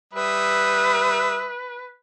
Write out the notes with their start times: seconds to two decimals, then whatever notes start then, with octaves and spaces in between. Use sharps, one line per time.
0.14 G3 B4 E5 D#6